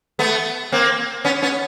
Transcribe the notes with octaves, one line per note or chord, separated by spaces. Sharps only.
A3 B3
A#3 C4
B3 C#4
B3 C#4